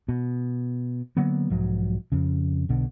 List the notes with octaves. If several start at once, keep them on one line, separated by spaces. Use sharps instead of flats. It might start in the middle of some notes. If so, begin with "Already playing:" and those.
B2
D3 F#3 A#3 B3
B1 G#2 F3 F#3
F2 C#3
B1 B2 D3